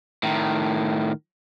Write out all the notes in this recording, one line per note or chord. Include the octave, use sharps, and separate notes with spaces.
A2 D#3